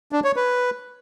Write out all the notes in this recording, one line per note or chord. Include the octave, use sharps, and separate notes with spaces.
D4
C#5
B4